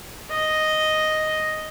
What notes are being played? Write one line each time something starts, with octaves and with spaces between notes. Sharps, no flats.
D#5